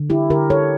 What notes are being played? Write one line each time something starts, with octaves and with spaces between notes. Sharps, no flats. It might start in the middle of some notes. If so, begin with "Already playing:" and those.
Already playing: D3
E4 G4
D3 G4 A#4
A4 C#5